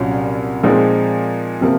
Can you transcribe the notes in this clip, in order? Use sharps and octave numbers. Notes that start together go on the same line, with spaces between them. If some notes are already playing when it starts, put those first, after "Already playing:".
Already playing: C2 A#2 F#3 C#4
A#2 F3 G#3 C4 D#4
C3 F3 A#3